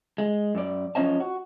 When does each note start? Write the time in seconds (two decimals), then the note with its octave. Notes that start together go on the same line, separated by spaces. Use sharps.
0.18 G#3
0.55 F#2 D5
0.95 F#2 F3 C#4 C#5 D#5 A5
1.20 F#4